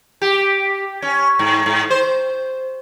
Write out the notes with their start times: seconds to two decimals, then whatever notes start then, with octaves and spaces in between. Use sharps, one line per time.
0.22 G4
1.02 C#4
1.39 G#2
1.66 G#2
1.90 C5